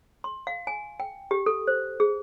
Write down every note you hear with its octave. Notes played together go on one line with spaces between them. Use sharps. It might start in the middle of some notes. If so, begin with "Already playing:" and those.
C6
F5
G#5
G5
G4
A4
C5
G#4